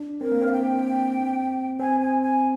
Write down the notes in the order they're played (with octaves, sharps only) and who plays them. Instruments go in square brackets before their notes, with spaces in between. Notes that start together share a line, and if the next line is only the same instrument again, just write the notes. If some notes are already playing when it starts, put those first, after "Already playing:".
Already playing: [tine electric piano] D4
[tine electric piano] C4 [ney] A#4
[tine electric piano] A#3
[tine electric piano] C4 [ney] F5
[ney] G5
[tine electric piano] C4 [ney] G#5
[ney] G#5
G#5